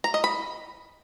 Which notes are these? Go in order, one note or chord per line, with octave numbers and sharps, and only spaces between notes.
A#5
D#5
B5